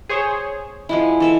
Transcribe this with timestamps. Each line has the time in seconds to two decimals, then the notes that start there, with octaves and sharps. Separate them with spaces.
0.09 G#4 C5 C#5
0.89 F3 G#3 E4
1.20 E3 A4 E5